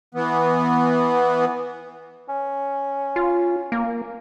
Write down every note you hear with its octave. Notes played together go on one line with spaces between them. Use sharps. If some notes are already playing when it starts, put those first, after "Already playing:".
E3 B3
C#4
F4
A#3